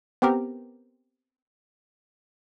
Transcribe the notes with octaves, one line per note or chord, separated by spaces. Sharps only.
B3 C4 G4 A#4